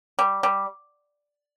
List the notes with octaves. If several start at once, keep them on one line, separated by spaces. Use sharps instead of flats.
G3
G3